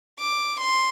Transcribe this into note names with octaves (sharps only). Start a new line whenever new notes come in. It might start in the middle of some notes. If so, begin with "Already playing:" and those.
D6
C6